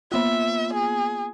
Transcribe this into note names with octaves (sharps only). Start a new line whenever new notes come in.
A#3 B3 F4 E5
G#4